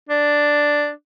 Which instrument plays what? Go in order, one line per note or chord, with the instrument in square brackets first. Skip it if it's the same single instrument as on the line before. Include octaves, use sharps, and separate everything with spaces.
[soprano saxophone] D4